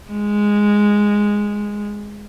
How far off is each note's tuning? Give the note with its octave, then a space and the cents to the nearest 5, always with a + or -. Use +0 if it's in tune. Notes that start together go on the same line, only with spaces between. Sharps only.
G#3 -5